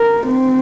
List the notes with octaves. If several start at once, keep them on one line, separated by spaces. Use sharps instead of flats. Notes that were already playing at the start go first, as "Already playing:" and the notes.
Already playing: A#4
C4